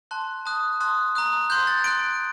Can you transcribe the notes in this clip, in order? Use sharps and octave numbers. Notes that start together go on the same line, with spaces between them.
A5 C6 F#6
A5 D#6 F#6
A5 C6 D#6 F#6
A#5 D#6 F#6
C6 F#6 G6
A6
C6 F#6 D7